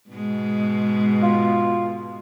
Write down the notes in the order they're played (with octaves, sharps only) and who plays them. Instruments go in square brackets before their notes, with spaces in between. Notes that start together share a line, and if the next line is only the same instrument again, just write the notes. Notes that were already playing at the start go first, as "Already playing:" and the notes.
[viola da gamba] G#2 B2 G#3
[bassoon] F4